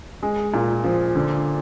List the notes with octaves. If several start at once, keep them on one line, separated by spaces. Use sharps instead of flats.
G#3
A#2
F3
D3